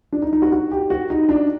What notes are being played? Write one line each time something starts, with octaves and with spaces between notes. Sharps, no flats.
D4
D#4
D#4
F#4
F#4
G4
F#4
D#4
D4